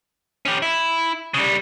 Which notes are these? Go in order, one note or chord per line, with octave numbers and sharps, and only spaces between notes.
C#4 G4
E4
C#3 G3